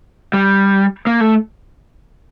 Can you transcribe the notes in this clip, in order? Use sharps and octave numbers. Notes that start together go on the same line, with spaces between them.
G3
A#3
A3